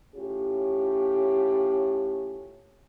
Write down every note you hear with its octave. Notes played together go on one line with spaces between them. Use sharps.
A2 C#4 F4 G4